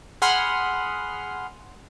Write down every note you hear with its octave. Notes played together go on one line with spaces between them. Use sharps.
G#4 F#5 B5 C6 D#6 F6